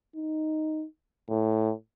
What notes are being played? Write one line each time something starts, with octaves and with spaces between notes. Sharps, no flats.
D#4
A2